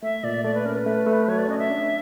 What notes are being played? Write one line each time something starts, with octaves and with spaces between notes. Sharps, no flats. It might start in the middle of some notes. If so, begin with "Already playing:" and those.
A3 E5
A#2 D5
A3 D5
B4
C#4 A#4
B4
A3
A3
F#3 C#5
D5
C#4 D#5
E5
D4